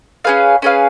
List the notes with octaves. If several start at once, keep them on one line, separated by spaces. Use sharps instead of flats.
C#4 G#4 B4 F5
C#4 G#4 B4 F5